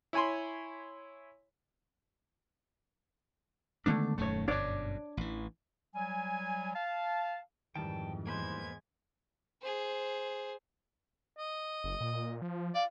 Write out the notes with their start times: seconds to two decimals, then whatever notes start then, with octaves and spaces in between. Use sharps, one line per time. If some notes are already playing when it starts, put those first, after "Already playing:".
0.13 E4 C#5 G#5 B5 C6
3.86 D3 D#3 G#3 A3 B3 D4
4.18 D#1 F#2 D#3 A3 C#5
4.48 G1 F#2 B2 D4 C#5 D5
5.17 A1 E3
5.95 F#3 G3 G#5
6.75 F5 A5
7.76 F2 G#2 D#3 E3 G3 G5 A5
8.27 E2 G#3 A#3 B4 C5 G#6
9.62 G#4 C5
11.39 D#5
11.84 F#1
12.01 A#2
12.42 F3
12.75 D5 F5